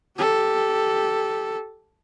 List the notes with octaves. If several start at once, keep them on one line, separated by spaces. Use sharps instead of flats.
G4 A4